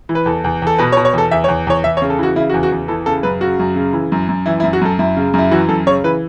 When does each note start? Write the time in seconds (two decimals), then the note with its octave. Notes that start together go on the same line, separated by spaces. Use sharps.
0.09 E3
0.15 B4
0.26 E2 A4
0.44 E2
0.62 E2 A4
0.79 B2 B4
0.92 C#5
0.97 B2
1.05 C#5
1.13 E2 A4
1.31 E2 E5
1.44 C#5
1.48 E2
1.67 E2 C#5
1.84 E2 E5
1.97 C#5
2.02 C#3
2.10 A4
2.19 E3 F#4
2.36 C#3 E4
2.49 F#4
2.54 E2
2.63 F#4
2.72 E2
2.88 E3 A4
3.06 C#3 A4
3.23 F#2 B4
3.41 C#3 F#4
3.59 F#2
3.76 C#3
3.93 E3
4.12 F#2
4.29 F#2
4.46 E3 E4
4.60 E4
4.64 F#2
4.73 F#4
4.81 F#2 A4
4.99 F#2 E4
5.17 C#3
5.34 F#2 E4
5.51 E3 F#4
5.69 F#2 A4
5.86 C#3 C#5
6.04 E3 B4